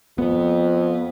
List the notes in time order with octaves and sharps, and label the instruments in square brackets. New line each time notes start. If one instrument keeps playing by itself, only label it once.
[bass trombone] F2 [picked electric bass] B3